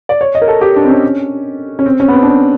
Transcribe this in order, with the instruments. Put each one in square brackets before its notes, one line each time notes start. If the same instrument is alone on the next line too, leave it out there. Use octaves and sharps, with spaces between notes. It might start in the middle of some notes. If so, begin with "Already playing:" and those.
[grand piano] D5
C#5
D#5
A#4
A4
G4
D4
C4
C#4
C#4
C4
C#4
B3
C4
D4
C#4